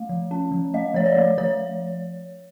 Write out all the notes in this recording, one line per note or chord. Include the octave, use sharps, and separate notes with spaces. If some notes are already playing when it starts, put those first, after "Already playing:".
Already playing: A3
F3
C#4
F3
A3 D#5
F3 C#5
D5
A3
F3 C#5